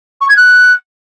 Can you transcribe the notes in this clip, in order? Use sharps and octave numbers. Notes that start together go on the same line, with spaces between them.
C#6
G#6
F#6